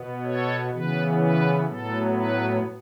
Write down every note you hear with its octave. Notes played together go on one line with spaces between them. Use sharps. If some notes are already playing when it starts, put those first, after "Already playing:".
Already playing: B2 B3
A4 C#5
C#3 E3 B3 B4
B4
A2 F#3 B3 A4
B4